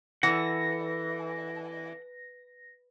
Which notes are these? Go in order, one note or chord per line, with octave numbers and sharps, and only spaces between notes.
E3 A4 F#5 A#6